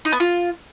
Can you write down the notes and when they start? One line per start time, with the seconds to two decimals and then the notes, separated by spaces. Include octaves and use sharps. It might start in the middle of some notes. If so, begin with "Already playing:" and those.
0.05 D#4
0.12 B3
0.20 F4